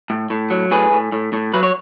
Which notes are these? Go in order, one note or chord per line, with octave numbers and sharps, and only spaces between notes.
A2
A2
F#3
A2 G#4 B4
A2
A2
A2
F#3 B4
C#5